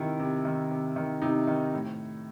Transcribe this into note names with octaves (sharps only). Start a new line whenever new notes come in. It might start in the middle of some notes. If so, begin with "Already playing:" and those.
Already playing: C3 D#3 E4
C3
D#3
C3
D#3
C3 D#4
D#3
A2